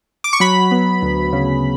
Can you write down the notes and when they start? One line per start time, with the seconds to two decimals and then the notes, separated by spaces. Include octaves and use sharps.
0.24 D6
0.33 C#6
0.40 F#3 B5
0.71 B3
1.02 D2
1.33 C#3